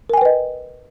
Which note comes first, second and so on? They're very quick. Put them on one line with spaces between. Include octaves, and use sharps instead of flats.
A#4 G#5 G5 B4 D#5